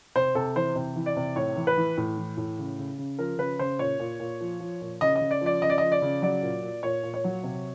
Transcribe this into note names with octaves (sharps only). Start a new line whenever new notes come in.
C3 C5
C3 A4
E3 C5
C3
E3
D5
C3
A2 C#5
E3
B4
E3
A2
E3
A2
C#3
C#3
C#3
F3 A#4
C#3 B4
C#3 C5
A#2 C#5
A#2
A#2
F3
F3
A#2
C#3 D#5
D#5
C#3
D5
F3 D5
C#3 D#5
D5
F3 D#5
D5
C#3
F#3 D5
A#2
A#2
A#2 C#5
A#2
C#5
F#3
C3